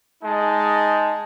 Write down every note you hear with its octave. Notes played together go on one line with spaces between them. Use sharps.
G#3 D#4 A5